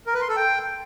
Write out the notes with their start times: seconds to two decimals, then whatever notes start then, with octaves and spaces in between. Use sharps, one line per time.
0.07 A#4
0.14 B4
0.22 C6
0.29 A4
0.36 G5